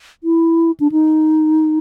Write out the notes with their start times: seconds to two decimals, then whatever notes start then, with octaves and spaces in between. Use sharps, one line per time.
0.24 E4
0.80 D4
0.92 D#4